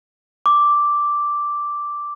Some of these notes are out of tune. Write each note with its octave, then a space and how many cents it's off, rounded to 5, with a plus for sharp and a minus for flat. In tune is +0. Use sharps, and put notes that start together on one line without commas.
D6 -5